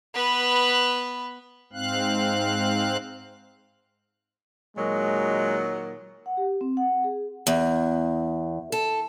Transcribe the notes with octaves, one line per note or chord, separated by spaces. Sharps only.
B3 B4
G#2 C4 F5 F#6
A#2 D#3 F#3 G#3
F#5
G4
C4
F#5
G#4
E2
A4